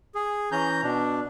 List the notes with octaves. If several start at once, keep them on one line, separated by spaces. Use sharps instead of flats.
G#4
E3 C#4 A#5 G6
B2 D4